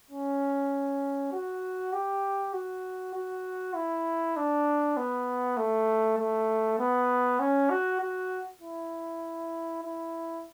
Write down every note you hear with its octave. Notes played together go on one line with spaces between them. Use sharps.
C#4
F#4
G4
F#4
F#4
E4
D4
B3
A3
A3
B3
C#4
F#4
F#4
E4
E4